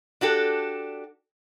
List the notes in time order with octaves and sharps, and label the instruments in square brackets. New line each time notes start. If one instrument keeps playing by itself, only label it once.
[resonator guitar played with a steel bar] D4 F#4 G4 A4